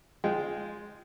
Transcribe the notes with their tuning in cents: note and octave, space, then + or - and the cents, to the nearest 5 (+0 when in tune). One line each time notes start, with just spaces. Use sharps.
G#3 +0 F4 +0 G5 -25